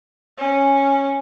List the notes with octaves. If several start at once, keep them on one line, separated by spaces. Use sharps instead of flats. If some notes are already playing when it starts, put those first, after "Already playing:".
C#4